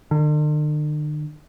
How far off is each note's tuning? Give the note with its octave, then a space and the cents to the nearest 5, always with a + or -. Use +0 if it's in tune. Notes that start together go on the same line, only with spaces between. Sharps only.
D3 +45